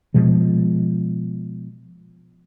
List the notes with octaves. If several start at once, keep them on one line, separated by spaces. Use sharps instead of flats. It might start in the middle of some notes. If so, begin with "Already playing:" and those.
B2 F3 G#3